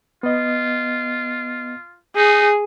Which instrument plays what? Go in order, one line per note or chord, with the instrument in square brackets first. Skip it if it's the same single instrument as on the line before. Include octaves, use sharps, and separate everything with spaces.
[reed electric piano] B3 D#5 [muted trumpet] F4
[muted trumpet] D#4 [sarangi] G#4